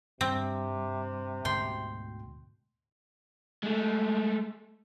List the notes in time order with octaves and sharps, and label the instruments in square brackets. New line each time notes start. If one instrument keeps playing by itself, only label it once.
[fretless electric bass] G2 [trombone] C3 [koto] C4
[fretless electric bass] D2 G#2 B2 [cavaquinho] G5 C6
[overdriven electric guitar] G#3 A3